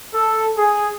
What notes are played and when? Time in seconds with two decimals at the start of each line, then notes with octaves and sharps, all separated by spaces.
0.11 A4
0.54 G#4